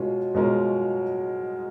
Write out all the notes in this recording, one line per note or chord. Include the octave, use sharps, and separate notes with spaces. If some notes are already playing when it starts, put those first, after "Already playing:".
Already playing: B2 G#3 C#4 F4 A#4
B2 G#3 C#4 F4 A#4